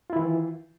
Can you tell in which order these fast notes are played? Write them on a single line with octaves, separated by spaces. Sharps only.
F4 E4 D#3 E3